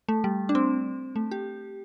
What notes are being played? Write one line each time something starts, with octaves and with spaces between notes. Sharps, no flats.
A3
G3
D4
C4
A3
G4